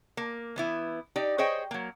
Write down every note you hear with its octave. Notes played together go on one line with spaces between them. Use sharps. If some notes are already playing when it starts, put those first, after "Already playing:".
A#3
E3 B3 E4
D#4 G4 D5
G#4 C5 C#5 D#5 G5
F#3 A#3